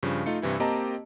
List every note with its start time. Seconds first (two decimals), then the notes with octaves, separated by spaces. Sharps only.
0.03 G2 C#3 F3
0.26 A3 D#4 F4 C#7
0.42 G2 C3 E3 E4
0.60 A#3 C4 G4 D#5 A5 A#5